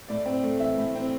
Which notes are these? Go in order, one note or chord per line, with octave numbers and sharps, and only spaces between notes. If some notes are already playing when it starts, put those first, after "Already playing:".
A2 D5
C4
A3
E3 E5
A2
C4